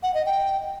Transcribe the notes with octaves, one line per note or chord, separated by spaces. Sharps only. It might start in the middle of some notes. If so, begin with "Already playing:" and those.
F#5
D#5
G5